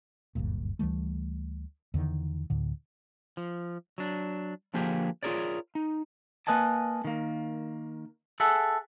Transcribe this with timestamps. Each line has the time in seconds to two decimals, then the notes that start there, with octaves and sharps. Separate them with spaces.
0.35 F#1 D2 G2 A#2
0.79 D2 E3 G3 A3
1.94 E2 D3 D#3
2.50 D2 A2 D3
3.37 F3
3.98 F#3 D4
4.74 D3 F3 A#3 G4 G#4
5.23 F4 F#4 G#4 A#4 C#5 D5
5.75 D#4
6.47 A#3 B4 D#5 G#5 A5
7.05 D#3 A#3
8.40 G#4 A4 E5 F#5